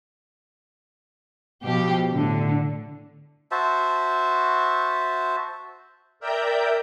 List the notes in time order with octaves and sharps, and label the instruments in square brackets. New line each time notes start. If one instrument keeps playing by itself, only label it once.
[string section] B2 F3 G4
A2 D3
[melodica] F#4 C5 E5 A5
[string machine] A#4 D5 E5 G5 A#5 G6